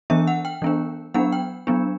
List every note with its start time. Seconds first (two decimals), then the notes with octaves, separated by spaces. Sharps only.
0.10 E3 B3 D4 E5
0.27 F#5
0.45 G5
0.62 E3 B3 D4
1.14 F#3 B3 D4 F#5
1.32 G5
1.67 F#3 B3 D4